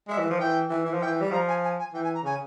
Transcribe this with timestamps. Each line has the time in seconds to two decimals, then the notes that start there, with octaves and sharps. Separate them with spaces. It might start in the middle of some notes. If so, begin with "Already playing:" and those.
0.08 G#3 E5
0.18 E3
0.30 F3
0.39 E3 G5
0.70 E3
0.85 E3
0.94 F3
1.01 E3 G5
1.21 G3
1.31 F3 A#5
1.48 G#5
1.63 G#5
1.79 G#5
1.94 E3 G5
2.03 G#5
2.14 A#5
2.24 C#3 G#5